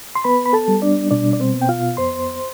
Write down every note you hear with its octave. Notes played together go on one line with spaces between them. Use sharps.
C6
B3 B4 B5
B5
A4 A5
G3
D4 D5
B2 D4 D5
D5
C4 C5
B3
G5
F4 F5
F2 C5 C6